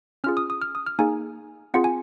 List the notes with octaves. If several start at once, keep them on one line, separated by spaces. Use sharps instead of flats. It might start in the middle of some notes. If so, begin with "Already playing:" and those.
C#4 F4 G#4 F6
D#6
D#6
F6
D#6
F6
A#3 D#4 G#4 G#5
C4 F4 G#4 F#5
G#5